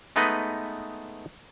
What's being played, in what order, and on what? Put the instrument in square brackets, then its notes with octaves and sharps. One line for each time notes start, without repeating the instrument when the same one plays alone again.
[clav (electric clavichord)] G#3 A3 B3 D#4 B4 D#5